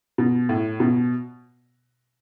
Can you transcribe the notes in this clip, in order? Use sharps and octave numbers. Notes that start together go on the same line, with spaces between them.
B2
A2
B2